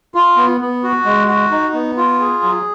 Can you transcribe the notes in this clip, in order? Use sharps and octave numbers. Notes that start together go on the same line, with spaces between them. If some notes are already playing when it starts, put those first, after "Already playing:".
F4
B3
B3
F#4
G#3
F#4
D#4
B3
F4
G#4
F#3